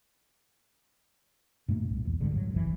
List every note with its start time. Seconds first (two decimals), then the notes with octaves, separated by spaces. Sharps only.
1.68 G2 A#2 A3 A#3
1.90 C2
2.05 E2
2.20 G1 G#2 D3
2.31 G2 F#3
2.52 F#1 C2 B2 E3